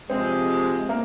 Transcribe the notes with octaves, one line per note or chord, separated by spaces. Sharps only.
C3 F3 G#3 C4
A#3